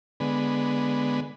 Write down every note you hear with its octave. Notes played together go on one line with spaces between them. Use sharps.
D3 G#3 B3